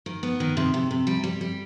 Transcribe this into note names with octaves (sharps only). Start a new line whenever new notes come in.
D#3
B3
D#3
C3
C3
C3
G3
G3
G3